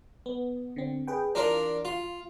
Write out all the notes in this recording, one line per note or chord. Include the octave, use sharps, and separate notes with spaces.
B3
D3 C4
G#4 B4 G5
E3 D4 F4 A#4 F5 A#5
F4 F5